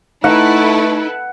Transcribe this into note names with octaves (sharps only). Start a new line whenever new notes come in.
A3 D#4 E4 A4 B4 F#5